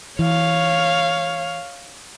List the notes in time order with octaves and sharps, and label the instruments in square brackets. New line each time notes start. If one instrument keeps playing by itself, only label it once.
[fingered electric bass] E3 [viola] C#5 F5